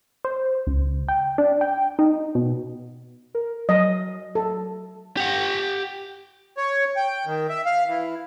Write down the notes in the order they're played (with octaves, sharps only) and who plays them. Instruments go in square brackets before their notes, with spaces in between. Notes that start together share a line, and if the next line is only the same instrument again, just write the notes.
[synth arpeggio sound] C5
C#2
G5
D4
G5
D#4
B2
[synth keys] A#4
[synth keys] F#3 [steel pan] D#5
[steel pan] A4
[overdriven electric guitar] G4 F#5
[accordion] C#5
G5
D#3
E5
F5
E3